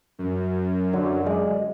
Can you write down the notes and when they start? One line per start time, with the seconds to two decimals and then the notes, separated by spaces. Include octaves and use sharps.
0.19 F#2
0.93 D3 F#3
1.26 G#3 D5